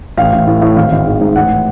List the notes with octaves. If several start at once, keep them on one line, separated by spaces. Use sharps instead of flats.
A1 F5
A1
A2
A2
G#1 F5
G#1
G#2
G#2
A1 F#5